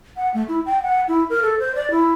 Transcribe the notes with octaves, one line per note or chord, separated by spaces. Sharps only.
F#5
A3
E4
G5
F#5
E4
A#4
A4
C5
D5
E4